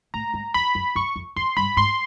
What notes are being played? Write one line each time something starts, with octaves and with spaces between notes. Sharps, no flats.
A2 A#5
G#2
F2 B5
F#2
F#2 C#6
F2
F2 C6
G2 B5
G#2 C6